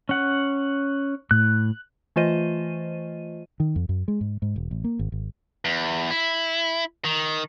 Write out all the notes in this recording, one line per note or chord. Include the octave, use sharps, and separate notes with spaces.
C#4 F#5
A2 F#6
E3 A3 F4 C5 D#5 D#7
D#3
F2
F#2
G#3
G#2
G#2
E1
A1
A#3
G#1
G#1
E2
E4
D#3